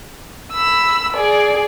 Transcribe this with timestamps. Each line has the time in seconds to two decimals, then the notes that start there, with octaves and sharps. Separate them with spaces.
0.53 B5 E6
1.13 G#4 D5